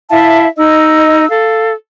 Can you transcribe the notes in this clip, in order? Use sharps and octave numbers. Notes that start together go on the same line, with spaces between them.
E4 E5 F5 A5
D#4 D#5 E6
A4 F5